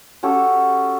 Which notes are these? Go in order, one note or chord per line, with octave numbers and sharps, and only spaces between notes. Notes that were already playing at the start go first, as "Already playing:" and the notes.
C#4 F#4 G4 A4